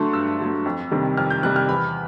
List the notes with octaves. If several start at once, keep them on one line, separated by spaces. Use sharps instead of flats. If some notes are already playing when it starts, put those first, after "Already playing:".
Already playing: D3 F#3 A3 C6 C#6
G2 E6
D3 F#3 A3
F2
C3 D#3 G3
F2 F6
G6
C3 D#3 G3 F#6
F6
E2 B5